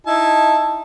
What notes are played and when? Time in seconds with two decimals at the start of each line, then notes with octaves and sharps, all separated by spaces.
0.07 D#4 E4 A5